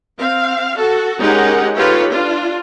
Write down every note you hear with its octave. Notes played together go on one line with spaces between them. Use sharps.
C4 F5
F#4 A4
G#3 C#4 D#4 G4 A#4 F#5
D#4 F4 G4 A4 B4 C#5
D4 F4